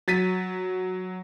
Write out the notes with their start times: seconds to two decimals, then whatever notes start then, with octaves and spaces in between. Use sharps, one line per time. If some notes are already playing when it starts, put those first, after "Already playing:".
0.08 F#3 A6 B6 D#7